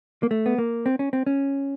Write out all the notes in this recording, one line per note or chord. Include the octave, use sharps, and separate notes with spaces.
A#3
A3
B3
A#3
C4
C#4
C4
C#4